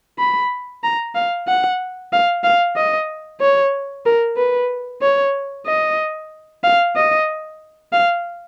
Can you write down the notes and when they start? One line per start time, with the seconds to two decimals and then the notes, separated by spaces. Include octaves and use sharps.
0.19 B5
0.84 A#5
1.15 F5
1.47 F#5
2.13 F5
2.44 F5
2.76 D#5
3.41 C#5
4.06 A#4
4.37 B4
5.02 C#5
5.67 D#5
6.64 F5
6.96 D#5
7.93 F5